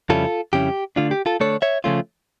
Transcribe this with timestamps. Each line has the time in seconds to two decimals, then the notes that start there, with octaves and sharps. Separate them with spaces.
0.09 F2 C#3 G3 C#4 E4 F4 A4
0.53 F2 C#3 G3 C#4 E4 G4
0.96 D3 A3 D4 F4
1.11 G4
1.26 F4 A4
1.40 D3 A3 D4 A4 C#5
1.62 C#5 E5
1.84 C#3 F3 A3 C#4 F4